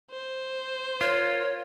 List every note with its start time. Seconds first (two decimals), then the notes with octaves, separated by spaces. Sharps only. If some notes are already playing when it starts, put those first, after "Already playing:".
0.11 C5
1.01 F4 A#4 C#5